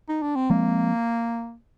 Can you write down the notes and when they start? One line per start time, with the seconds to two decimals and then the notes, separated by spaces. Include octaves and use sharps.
0.09 D#4
0.22 D4
0.35 C4
0.50 F3 G#3 A#3 C4